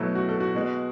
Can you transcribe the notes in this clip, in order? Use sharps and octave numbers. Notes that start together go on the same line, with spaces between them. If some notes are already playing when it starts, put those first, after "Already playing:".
Already playing: B2 F#3 A3 E4
F#4
A4
F#4
B2 G#3